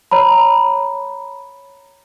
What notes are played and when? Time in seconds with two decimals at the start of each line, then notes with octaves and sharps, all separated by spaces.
0.11 C#5 A#5 B5